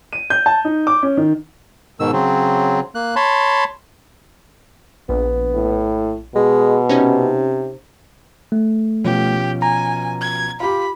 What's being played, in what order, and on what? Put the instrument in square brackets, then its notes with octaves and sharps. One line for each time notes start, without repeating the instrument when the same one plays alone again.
[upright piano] D#7
G6
A5
D#4
D6
C#4
D#3
[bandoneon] G#2 B2 D#3 E6
C#3 F#3 C4
A#3 F#6
C#5 A5 B5 C6
[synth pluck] A#1 [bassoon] B3
[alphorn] A2
[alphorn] B2 [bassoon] G#3
[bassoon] C3 [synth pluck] C#4 D#4 C#5
[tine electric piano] A3
[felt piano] B2 F3 C#4 [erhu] G4
[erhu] G#5 [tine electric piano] A#5
[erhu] G#6
[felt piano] F4 G4 [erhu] B5